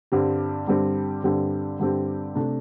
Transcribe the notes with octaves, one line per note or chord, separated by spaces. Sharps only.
G2 D3 G3 C4 G4
G2 D3 G3 C4 G4
G2 D3 G3 C4 G4
G2 D3 G3 C4 G4
C3 A3 D4